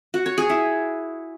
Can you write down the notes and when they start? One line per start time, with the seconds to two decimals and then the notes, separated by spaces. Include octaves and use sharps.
0.14 F#4
0.26 C#5
0.38 G#4
0.50 E4